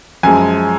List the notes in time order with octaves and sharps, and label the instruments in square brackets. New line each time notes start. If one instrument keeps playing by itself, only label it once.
[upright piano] F#2 F3 G#3 G#5